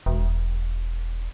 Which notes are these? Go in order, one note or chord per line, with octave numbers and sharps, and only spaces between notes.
E1